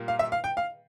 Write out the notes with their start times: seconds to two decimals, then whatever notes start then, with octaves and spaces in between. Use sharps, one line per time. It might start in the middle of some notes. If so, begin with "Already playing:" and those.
Already playing: A#2 G3 A#3
0.08 F5
0.19 E5
0.32 F5
0.44 G5
0.57 F5